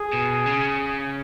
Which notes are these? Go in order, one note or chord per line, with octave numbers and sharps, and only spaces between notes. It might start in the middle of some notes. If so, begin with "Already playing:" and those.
Already playing: G#4
B2
C#3